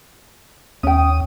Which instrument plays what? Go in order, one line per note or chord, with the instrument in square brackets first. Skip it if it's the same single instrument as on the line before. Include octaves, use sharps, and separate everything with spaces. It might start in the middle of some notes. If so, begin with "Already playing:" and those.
[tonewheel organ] D#2 D#6 [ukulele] C#4 G5